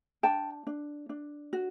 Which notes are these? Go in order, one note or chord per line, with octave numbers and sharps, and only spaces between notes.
D4 G5 A5
D4
D4
F#4